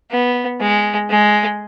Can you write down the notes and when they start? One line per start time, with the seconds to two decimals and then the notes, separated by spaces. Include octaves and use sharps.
0.11 B3
0.61 G#3
1.10 G#3